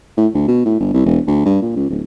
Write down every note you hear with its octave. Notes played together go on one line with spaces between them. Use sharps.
A2
D2
B2
A2
G1
C2
E1
D2
G2
A#2
C#2
D1